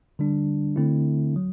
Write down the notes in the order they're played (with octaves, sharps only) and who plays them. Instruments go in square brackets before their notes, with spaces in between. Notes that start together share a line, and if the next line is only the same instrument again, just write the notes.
[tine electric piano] D3 G3 D4
D3 A3 C4 E4
F#3